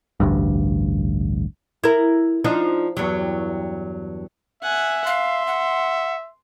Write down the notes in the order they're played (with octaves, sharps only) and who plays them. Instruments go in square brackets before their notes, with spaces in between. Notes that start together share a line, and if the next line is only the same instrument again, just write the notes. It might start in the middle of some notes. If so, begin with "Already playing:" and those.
[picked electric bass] A1 D2 G2
[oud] E4 A#4
F3 D4 D#4
E2 G2 F#3
[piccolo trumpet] E5 [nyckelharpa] F#5 G#5
[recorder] F5 [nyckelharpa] C6
[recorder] F#5